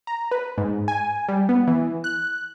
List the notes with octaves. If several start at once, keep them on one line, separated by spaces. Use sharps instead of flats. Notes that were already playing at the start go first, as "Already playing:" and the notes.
A#5
B4
G#2
G#5
G3
B3
E3
F#6